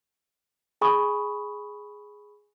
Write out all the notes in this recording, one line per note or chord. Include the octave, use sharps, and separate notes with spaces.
G#4 G#5 B5 C#6 D#6